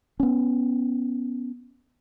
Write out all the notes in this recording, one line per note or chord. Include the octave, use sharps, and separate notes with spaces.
B3 C#4